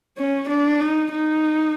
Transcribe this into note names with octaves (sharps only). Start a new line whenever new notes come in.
C#4
D4
D#4
D#4